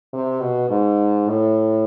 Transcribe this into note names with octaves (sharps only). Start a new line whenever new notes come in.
C3
B2
G#2
A2